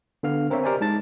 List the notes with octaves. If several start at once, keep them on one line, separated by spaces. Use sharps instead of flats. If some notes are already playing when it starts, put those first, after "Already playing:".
D3 B3 F5 F6
C4 A#4 C5 C#5 E5
G4 A#4 C5 D5 D#5 G#5
G#3 D#4 A5 A6